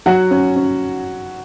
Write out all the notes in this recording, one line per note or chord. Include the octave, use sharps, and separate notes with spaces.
F#3 F#4 F#5
C#4
C#4